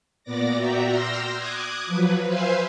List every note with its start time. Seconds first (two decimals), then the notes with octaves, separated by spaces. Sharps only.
0.23 A#2 B3 D5 D6 A#6
0.55 F#4 D5 E5 G5 A#5
0.88 C6 E6 F6 G6 A#6
1.35 D6 D#6 F#6 G#6
1.86 F3 F#3 B4
2.26 B4 C5 E5 F5 G#5 C6